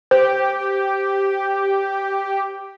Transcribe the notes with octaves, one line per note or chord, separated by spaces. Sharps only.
G4 C5